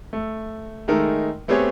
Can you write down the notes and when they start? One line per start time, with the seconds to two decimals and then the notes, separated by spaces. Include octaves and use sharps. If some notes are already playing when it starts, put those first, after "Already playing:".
0.13 A3
0.88 D#3 G#3 A3 D#4 A#4
1.48 A3 B3 C4 G4 G#4 C#5